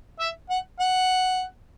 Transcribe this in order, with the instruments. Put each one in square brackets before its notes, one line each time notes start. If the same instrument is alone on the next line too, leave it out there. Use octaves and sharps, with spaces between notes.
[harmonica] E5
F#5
F#5